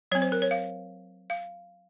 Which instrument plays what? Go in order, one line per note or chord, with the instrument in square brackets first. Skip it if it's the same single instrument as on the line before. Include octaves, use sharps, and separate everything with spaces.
[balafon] F#3 C#5
C4
C5
A#4
C#5
F5
F5